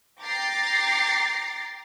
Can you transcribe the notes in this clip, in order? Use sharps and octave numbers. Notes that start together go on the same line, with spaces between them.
G5 A#5 D6 A6 A#6 C7